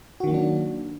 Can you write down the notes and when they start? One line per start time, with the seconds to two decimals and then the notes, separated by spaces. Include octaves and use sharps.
0.20 F#4
0.24 D#3
0.27 A#3
0.31 F#3
0.34 D4